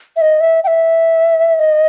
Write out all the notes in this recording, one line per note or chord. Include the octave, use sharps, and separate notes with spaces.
E5
D#5
E5
G5
E5
D#5